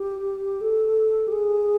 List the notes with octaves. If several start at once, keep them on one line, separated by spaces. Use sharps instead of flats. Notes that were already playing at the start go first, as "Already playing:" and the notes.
Already playing: G4
A4
G4
G#4